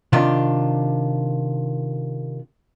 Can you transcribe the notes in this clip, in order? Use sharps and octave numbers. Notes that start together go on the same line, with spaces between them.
C3 D#3 D4 F4